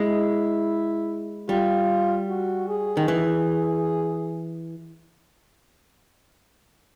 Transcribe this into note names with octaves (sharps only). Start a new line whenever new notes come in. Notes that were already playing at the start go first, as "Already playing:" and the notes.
Already playing: G#3 E4
G3 F4
F#4
G#4
D#3
E3